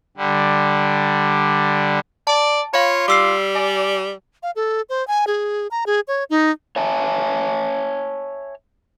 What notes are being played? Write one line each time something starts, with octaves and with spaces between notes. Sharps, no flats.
D3 G3
D5 A5
F4 C#5 F5 B5
G3 D6 E6 C7
D5 G#5
F5
A4
C5
G#5
G#4
A#5
G#4
C#5
D#4
C#5 E5 G#5 A5